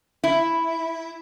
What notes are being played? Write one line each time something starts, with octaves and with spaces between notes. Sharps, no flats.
E4